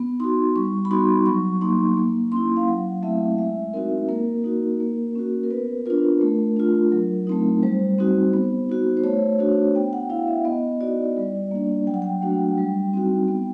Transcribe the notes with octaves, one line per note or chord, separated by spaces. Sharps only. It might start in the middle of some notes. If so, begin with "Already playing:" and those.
Already playing: B3
D#4 F#4 C6
G3 C#6
B5
B3 D#4 F#4 C6
F#3 C#6
A#3 D#4 C6
A#3
C#4 E4 C6
F5
F#3 F#5
A3 C4 E4 E5
G#3 E5
C4 D#4 F#4 A#4
A#3 A#4
D#4 F#4
A#3
C#4 F#4
A#4
B3 B4
D4 F4 A#4
A3
D4 F4
F#3
A3 C4 D#4
G3 C5
C4 D#4 F#4
B3
D#4 F#4
C5
A3 C#5
D4 F#4
B3 G5
F#5
E4 F5
E5
B3 D#5
D#4 F#4 D5
G3
A#3 D4
F#3 G5
F#5
G5
A3 D4 F#4
G3
C4 D#4 F#4
B3